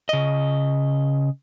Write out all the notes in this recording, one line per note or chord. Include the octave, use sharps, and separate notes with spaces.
C#3 D#5